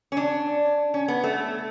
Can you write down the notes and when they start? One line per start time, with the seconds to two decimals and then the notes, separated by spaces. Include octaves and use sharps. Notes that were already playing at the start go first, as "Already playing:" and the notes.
0.12 C#4
0.17 D4
0.94 C#4
1.08 B3
1.24 A3